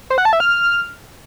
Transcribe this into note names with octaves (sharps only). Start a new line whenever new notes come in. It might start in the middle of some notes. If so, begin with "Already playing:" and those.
C5
F#5
A5
E5
F6